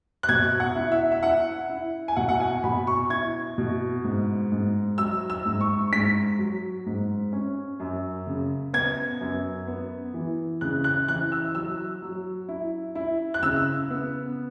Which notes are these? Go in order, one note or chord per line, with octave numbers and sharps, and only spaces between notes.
F#6
B2 G#6
F#5
E4
E5
E5
E4 F#5
E4
G#5
B2 F#5
F#5
G#5
B2 B5
C#6
E4 G#6
B2
G#2
G#2
F#3 E6
E6
G#2
C#6
G#2 B6
F#3
G#2
C#4
F#2
C#3
B3 G#6
F#2
B3
E3
C#3 F#6
F#6
E3 F#6
E6
F#3 E6
F#3
E4
E4
F#6
C#3 E6
B3